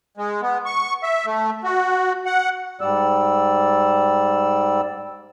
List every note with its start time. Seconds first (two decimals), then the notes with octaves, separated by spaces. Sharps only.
0.17 G#3
0.42 B3
0.66 C#6
1.03 E5
1.26 A3
1.64 F#4
2.26 F#5
2.81 G#2 G3 D5 E6